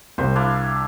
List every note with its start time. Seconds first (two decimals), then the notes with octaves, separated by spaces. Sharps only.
0.18 C2 C5
0.36 D4 E4 F5